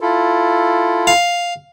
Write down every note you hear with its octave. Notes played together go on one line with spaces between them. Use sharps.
E4 F4 A4
F5